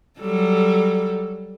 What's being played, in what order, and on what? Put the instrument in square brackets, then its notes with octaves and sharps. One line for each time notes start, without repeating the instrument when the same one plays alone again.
[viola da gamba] F#3 G3 A4